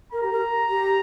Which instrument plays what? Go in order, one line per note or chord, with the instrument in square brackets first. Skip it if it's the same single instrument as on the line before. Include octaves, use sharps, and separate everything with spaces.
[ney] A#4 [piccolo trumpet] A#5
[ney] G4
A#4
G4